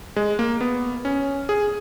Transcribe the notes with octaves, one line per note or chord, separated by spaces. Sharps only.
G#3
A#3
B3
C#4
G#4